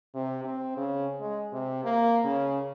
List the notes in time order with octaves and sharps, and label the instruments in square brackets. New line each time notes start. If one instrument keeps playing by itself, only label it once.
[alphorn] C3
C4
C#3
G#3
C3
A#3
C#3